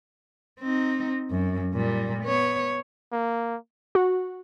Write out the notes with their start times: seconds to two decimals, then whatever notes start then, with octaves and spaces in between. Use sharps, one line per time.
0.60 C4 D#4
1.31 F#2
1.74 A#2 G3
2.23 B3 C#5
3.12 A#3
3.95 F#4